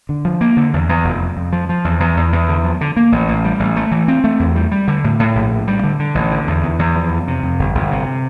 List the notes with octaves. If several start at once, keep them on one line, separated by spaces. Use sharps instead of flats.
D3
F3
A#3
D3
E2
E2
F1
F2
F2
F3
F3
E2
E2
E2
E2
D3
F3
D3
A#3
A1
A1
G3
A1
A3
E3
C4
A3
E2
G3
G3
D3
A2
A2
A#1
A2
G3
D3
D3
A1
D3
E2
E2
E2
F3
F2
C3
F2
G1
G1
C3